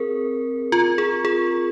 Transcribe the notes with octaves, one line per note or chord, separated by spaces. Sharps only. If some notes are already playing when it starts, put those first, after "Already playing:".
Already playing: C4 G#4 A#4
F4
G#4
G#4